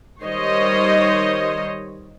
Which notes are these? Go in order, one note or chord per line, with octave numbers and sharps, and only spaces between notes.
D#3 G3 C5 C#5 D#5